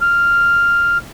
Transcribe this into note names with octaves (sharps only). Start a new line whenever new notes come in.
F6